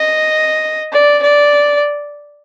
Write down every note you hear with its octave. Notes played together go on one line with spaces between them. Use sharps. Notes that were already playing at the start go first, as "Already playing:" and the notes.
Already playing: D#5
D5
D5